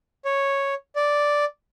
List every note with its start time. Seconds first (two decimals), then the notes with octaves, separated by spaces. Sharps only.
0.25 C#5
0.96 D5